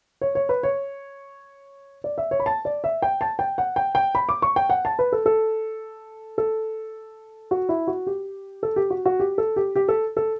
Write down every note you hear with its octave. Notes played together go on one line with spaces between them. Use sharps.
C#5
C#5
B4
C#5
D5
E5
C#5
B5
A5
D5
E5
G5
A5
G5
F#5
G5
G5
B5
D6
C#6
G5
F#5
A5
B4
A4
A4
A4
F#4
E4
F#4
G4
A4
G4
F#4
F#4
G4
A4
G4
G4
A4
A4